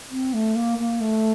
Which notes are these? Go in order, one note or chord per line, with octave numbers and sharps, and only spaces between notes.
C4
A3
A#3
A#3
A3